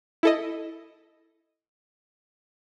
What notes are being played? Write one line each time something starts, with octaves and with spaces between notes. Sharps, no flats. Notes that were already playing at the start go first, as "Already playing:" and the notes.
E4 A4 D#5